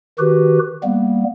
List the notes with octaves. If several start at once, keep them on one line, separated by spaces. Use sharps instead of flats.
D#3 F#4 G4 B4
G3 A#3 B3